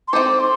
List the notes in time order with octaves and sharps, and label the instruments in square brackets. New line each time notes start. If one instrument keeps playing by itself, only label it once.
[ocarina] C6
[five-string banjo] C4 D#4 A4 C5 [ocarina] D6
[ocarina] C6